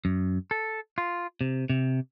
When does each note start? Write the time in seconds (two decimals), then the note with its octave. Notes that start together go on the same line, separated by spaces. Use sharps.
0.05 F#2
0.51 A4
0.98 F4
1.41 C3
1.70 C3